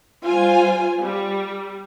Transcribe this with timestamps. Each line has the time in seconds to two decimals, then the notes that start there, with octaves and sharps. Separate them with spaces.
0.25 G3 F4 C5 G#5
1.02 G3